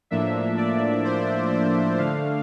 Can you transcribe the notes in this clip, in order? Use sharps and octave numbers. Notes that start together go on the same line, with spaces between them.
A2 F3 A#3 D4 E5
D5
C5
D5
D3 A3 D4 F5